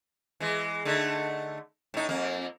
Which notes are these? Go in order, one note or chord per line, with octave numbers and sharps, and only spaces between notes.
E3 G#3
D3 A3 D#4
A2 D#4
F2 A#3